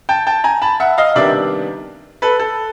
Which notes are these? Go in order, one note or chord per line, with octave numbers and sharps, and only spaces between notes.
G5 A5
G5 A5
G#5 A#5
A5 B5
E5 F#5
D#5 F5
C3 D#3 G3 B3 D4 D5 E5
A4 B4
A4